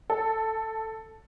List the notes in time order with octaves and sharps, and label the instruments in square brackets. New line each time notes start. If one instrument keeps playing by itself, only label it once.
[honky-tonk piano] A4